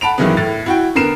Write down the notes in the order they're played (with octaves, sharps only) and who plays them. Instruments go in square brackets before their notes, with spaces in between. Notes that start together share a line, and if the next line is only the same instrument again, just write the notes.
[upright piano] F#5 A5 B5 D7 F7
G2 D#3 E3 F#3 G#3 B3
A2 A6
E4 F#4 G5
D3 B3 A#4 C7 E7